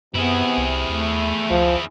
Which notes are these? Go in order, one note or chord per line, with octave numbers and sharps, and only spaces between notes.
F#2 C3 B3 E4 G#4
C2
D#2 A3
C#2 F3